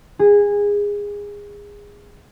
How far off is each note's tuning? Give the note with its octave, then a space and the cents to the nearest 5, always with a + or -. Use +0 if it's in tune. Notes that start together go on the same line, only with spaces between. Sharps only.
G#4 -20